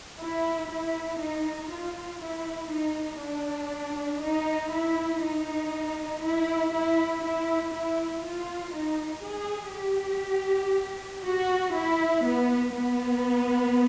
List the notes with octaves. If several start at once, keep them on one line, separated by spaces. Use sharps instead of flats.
E4
E4
D#4
F4
E4
D#4
D4
D#4
E4
D#4
E4
E4
E4
E4
F4
D#4
G#4
G4
F#4
E4
B3
B3